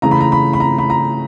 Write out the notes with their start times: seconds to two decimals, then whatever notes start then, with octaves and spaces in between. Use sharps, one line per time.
0.02 C#3 E3 A3 A#5
0.11 B5
0.21 A#5
0.32 B5
0.53 B5
0.60 A#5
0.78 B5
0.90 A#5